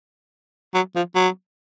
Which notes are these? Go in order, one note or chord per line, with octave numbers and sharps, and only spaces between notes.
F#3
F3
F#3